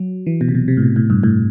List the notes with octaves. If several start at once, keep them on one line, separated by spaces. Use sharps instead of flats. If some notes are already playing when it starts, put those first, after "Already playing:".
Already playing: F#3
E3
B2
C3
B2
C3
A2
B2
A2
G2
A2